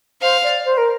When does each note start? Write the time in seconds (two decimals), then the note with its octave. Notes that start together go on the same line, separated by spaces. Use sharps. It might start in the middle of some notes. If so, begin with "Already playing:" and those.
0.22 C5 F5
0.43 D5
0.65 C5
0.78 A#4